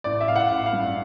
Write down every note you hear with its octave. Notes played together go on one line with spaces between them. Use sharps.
A1 D5
E5
A1 F5
F#5
A1
F5
G2